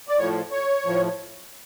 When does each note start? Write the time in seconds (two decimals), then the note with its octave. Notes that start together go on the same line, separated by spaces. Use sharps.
0.08 D5
0.18 A2 F3 C#5
0.52 C#5
0.85 A2 F3